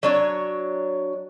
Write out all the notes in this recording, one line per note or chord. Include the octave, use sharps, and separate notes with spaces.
F#3 D4 C#5